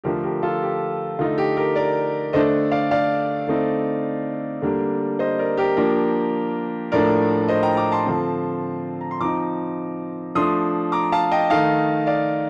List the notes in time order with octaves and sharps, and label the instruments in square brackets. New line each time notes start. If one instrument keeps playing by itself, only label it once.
[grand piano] D3 F3 A3 D4 G4 A#4
G4 A#4
F4 A4
G4
D3 A3 D#4 F4
G4
G4 A#4
A#4 D5
D3 A3 D4 C5 D#5
D5 F5
D5 F5
D3 A3 C4 D#4
D3 G3 A#3 D4
C5 D#5
A#4 D5
G4 A#4
F3 A#3 D4
A2 F3 A3 D4 A#4 D5
C5 D#5
G5 A#5
A#5 D6
A5 C6
D3 F3 C4
A#5
C6
F3 C4 D#4 A#5 D6
F3 A3 D4 C6 D#6
A#5 D6
F5 A5
D#5 G5
D#3 A3 D#4 F5 A5
D5 F5